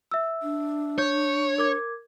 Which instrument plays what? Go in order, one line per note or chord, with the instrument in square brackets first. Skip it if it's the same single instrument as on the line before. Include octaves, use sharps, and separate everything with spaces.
[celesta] E5 E6
[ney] D4
[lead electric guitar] C#5 [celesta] G6
[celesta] A#4 D6 G#6